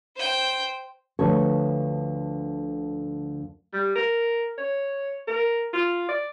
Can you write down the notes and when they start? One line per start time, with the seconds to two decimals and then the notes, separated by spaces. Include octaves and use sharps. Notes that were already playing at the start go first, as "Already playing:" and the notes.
0.16 C5 G5
1.19 D2 D3 F3 A4 B4 C#5
3.73 G3
3.96 A#4
4.58 C#5
5.28 A#4
5.73 F4
6.09 D5